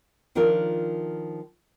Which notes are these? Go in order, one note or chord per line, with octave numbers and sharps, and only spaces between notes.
D#3 F3 D4 F4 A#4